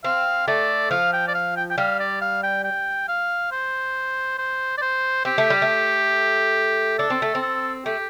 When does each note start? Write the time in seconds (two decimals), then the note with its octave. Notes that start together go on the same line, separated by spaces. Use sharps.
0.04 C4 F5
0.48 A3 D5
0.91 F3 F5
1.13 G5
1.28 D5
1.35 F5
1.57 G5
1.71 G5
1.78 G3 F5
2.00 D5
2.21 F5
2.43 G5
2.64 G5
3.08 F5
3.51 C5
4.38 C5
4.78 D5
4.82 C5
5.25 C4 G4
5.38 A3
5.50 G3
5.62 A3
6.99 D4 A4
7.10 C4
7.22 A3
7.35 C4
7.42 A4
7.85 A3 G4